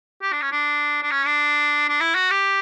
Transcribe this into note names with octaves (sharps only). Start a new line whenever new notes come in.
G4
D4
C#4
D4
D4
C#4
D4
D4
E4
F#4
G4